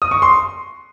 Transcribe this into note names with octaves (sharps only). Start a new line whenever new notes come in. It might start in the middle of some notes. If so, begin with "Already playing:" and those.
D#6
C#6
C6